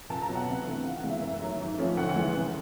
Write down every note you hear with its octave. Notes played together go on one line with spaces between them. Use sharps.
C#2 A5
A#5
B2 F#3 B3
F#5
C3
E3 A3 D4
C#2 F5
F#5
C#3 E3 G#3 B3
E5
F#2
D#3 F#3 A3
G#2
F3 A3 C#4
D2 F#5
F#5
C#3 E3 G#3
C2